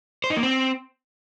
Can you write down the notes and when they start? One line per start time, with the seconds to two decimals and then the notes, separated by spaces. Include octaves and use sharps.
0.24 C5
0.30 D#4
0.37 A#3
0.43 C4